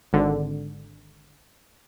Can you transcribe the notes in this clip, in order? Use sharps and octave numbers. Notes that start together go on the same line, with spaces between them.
G#1 D3